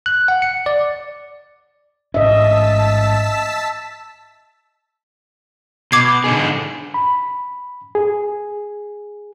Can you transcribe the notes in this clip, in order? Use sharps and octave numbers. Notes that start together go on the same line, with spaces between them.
F#6
F#5
C#7
D5
A1 G#2 C#4 D#5 E5 A5 E6 B6
B2 D6 G#6 C7
D3 D#4 G#4
B5
G#4